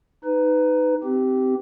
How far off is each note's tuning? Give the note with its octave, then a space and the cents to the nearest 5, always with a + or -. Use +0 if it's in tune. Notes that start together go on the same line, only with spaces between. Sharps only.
D#4 +0 B4 +20
C4 -20 G4 -10